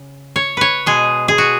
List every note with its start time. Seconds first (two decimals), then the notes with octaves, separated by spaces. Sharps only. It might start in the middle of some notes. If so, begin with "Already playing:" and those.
Already playing: C#3
0.36 C#5
0.57 B4 C#5
0.86 B2 G#3 G#4
1.28 G#4
1.38 F#4